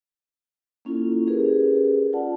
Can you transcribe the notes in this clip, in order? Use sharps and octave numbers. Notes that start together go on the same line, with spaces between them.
A#3 C#4 E4 F4 A4
C#4 G4 G#4 A#4 B4
F4 D5 F#5 A5